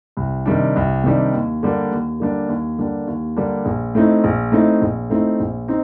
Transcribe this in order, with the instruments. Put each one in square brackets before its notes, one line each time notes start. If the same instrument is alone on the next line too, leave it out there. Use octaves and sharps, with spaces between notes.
[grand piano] C2
C3 D#3 G3 D4
C2
C3 D#3 G3 D4
D#2
D3 G3 A#3 D4
D#2
D3 G3 A#3 D4
D#2
D3 G3 A#3 D4
D#2
D3 G3 A#3 D4
A#1
A2 A3 C4 D#4
A#1
A2 A3 C4 D#4
A#1
A2 A3 C4 D#4
A#1
C4 D#4